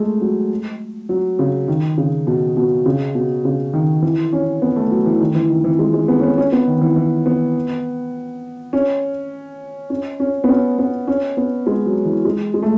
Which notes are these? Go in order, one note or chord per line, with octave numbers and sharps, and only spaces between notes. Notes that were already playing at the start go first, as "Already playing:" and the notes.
Already playing: G#3 A3
F#3
F#3
C#3
D#3
C#3
B2
B2
C#3
B2
C#3
D#3
E3
C#4
B3
A3
F#3
E3
D#3
E3
D#3
E3
G#3
G#3
B3
C#4
B3
C#4
B3
D#3
E3
E3
B3
C#4
C#4
C#4
B3
C#4
B3
C#4
B3
G#3
F#3
E3
G#3
G#3
A3